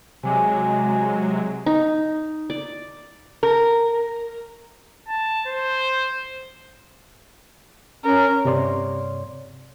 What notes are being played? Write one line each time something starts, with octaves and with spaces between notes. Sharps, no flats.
C3 F#3 G#3 G#5 D6
D#4
D5
A#4
A5
C5
C#4 A#4
G2 C3 C#5 D5 C6